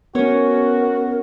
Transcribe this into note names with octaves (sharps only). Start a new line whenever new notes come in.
B3 C#4 F#4 A#4 C#5